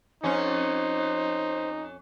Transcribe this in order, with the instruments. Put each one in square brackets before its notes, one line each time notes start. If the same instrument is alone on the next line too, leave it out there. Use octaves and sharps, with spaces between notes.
[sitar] F2 C#4 [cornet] D#4 [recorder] C5